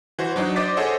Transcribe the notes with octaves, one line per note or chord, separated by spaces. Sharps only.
E3 F#4 C5
F#3 D4 D#4
C5 D5 D#5 D6 A6 B6
G#4 A4 C5 C#5 D#5 F#5